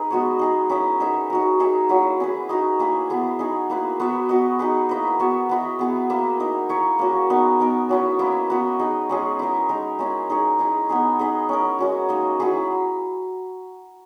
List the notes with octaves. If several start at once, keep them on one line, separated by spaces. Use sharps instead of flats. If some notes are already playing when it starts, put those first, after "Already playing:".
Already playing: D#4 G#4 B4
G#3 B3 F#4 C#5
D#4 G#4 D#5
C#4 E4 A#4 E5
D#4 G#4 B4 E5
D#4 F#4 A#4
D#4 G#4 C#5 E5
F#3 A#3 E4
C#4 E4 G#4 B4
D#4 F#4 A#4 D#5
A#3 E4 G#4 B4
B3 E4 G#4
D#4 G#4 C#5
A#3 E4 B4
B3 F#4 B4 E5
B3 F#4 B4 D#5
D#4 G#4 B4
A#3 E4 B4 D#5
B3 F#4 C#5 E5
B3 E4 B4 D#5
B3 E4 G#4 B4
A#3 E4 B4 E5
D#4 A#4 D#5
E4 A#4 C#5
A#3 C#4 F#4 A#4
B3 D#4 A#4
B3 D#4 A#4
F#3 C#4 E4 B4
A#3 E4 B4 D#5
B3 F#4 B4 D#5
D#4 G#4 B4 D#5
G#3 C#4 G#4
E4 A#4 D#5
G#3 D#4 A#4
G#3 C#4 E4
D#4 G#4 C#5
E4 G#4 D#5
B3 D#4 G#4
D#4 G#4 B4 D#5
C#4 E4 A#4
G#3 C#4 F#4
A#3 D#4 A#4 D#5
F#3 C#4 E4 G#4